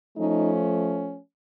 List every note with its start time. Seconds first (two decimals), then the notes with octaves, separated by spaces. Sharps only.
0.16 F3 A3 C#4 D#4